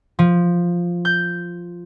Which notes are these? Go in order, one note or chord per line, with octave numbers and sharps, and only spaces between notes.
F3
G6